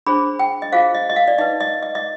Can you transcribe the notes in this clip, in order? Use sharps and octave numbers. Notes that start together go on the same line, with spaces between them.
D4 G#4 C5 B5
G5
D#5
F4 G#4 C5 F5
D#5
D#5
F5
D5
D#4 B4 D#5
D#5
D#5
D#5